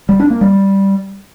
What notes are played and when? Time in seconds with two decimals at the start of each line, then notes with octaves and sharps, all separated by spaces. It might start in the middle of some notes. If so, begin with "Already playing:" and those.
0.09 G3
0.20 D4
0.30 A#3
0.41 G3